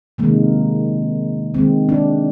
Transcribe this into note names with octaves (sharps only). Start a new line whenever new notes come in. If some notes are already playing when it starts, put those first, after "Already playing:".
C3 D#3 G#3 A#3
D#3 G#3 C4
D4